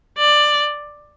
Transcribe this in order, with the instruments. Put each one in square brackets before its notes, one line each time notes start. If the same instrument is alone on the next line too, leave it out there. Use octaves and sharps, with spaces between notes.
[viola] D5